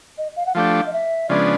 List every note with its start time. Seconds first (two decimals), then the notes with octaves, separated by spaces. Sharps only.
0.18 D#5
0.36 F5
0.46 F#5
0.55 F3 A3 D4 G4 F5
0.86 D#5
0.93 E5
1.29 C#3 F3 G#3 B3 D4 D5